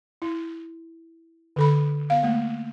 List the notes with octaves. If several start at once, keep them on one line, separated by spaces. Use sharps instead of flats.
E4
D3 A4 B5
B3 F5
A3 A#3